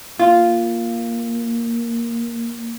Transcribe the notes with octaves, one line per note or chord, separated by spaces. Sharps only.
A#3 F4